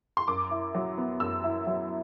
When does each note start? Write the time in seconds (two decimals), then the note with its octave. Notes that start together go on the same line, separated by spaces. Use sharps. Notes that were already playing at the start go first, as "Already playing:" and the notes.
0.17 C6
0.27 F#2 D6
0.51 E4
0.75 F#3
0.98 B3
1.20 F#2 E6
1.44 E4
1.67 F#3